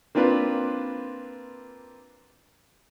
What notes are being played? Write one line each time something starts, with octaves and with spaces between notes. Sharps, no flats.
A#3 C4 D4 F4 B4